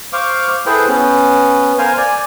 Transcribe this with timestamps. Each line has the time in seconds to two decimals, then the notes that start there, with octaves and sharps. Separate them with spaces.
0.13 C5 F5 C#6 D6
0.66 E4 G#4 A4 B4 C5 G5
0.88 B3 C#4
1.78 A#4 C5 F5 G#5
1.98 D5 G#5